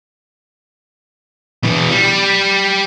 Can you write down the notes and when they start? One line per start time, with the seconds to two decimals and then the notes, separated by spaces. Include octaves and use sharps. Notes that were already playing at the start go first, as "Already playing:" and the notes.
1.63 B2 E3
1.90 G3